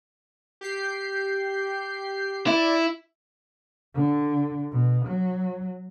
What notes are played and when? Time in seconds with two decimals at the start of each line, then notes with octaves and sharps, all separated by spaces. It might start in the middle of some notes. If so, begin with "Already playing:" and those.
0.61 G4 G6 C7
2.47 E4 D5
3.95 D3
4.71 B2
5.06 F#3